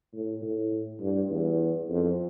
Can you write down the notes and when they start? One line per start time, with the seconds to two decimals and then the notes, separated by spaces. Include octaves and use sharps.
0.13 A2
0.42 A2
1.00 G2
1.30 E2
1.89 F2